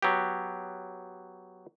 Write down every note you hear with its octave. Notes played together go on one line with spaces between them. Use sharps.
F#3 B3 G4